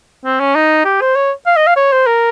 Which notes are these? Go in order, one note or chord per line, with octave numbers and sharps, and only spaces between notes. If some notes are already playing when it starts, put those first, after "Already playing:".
C4
C#4
D#4
G4
C5
C#5
F5
D#5
F5
C#5
C5
A#4